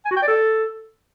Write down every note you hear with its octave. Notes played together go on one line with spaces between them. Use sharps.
G#5
F#4
G5
D5
A4